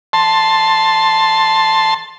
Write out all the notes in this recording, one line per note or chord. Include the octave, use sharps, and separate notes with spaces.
A5 C6